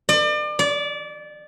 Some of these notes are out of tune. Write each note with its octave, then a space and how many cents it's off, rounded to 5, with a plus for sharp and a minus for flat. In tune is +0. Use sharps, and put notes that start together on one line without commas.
D5 +35
D5 -25